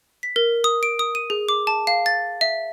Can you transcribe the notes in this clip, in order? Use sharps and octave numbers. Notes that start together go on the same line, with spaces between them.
B6
A#4
D#6
D7
D#6
D#7
G#4
D6
A5
F5
A6
E5